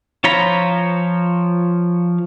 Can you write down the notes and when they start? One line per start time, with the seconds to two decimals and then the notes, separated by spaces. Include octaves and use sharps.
0.24 F3 F4 C#5 A#5 B5